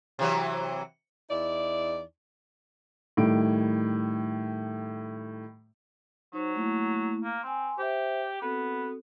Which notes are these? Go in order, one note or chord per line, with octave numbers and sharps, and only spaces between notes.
C3 E3 F#3
E2 D#4 E4 D5
A2 D#3 G3 D7
F#3 D#4 C5
A3 A#3 E4
A#3
C4 G#5 C6
G4 C5 E5
B3 C4 F#4 A4